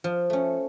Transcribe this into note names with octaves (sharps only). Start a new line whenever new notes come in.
F3
A3 C#4